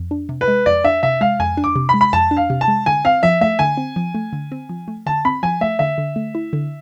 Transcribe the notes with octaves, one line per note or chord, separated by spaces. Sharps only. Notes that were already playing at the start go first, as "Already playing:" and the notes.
Already playing: F2
D4
C3
B4
G#3
F2 D5
D4 E5
C3 E5
G#3 F5
F2 G#5
D4
D6
C3
B5
G#3
B5
F2 A5
D4
F5
C3
A5
G#3
D3 G#5
C4 F5
F3 E5
A3 E5
D3 G#5
C4
F3
A3
D3
C4
F3
A3
D3 A5
C4 B5
F3 G#5
A3 E5
D3 E5
D3
A3
E4
D3